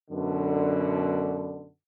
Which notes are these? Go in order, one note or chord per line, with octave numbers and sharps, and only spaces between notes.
F#2 B2 D3